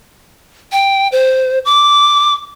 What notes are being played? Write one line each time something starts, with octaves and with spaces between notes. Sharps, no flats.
G5
C5
D6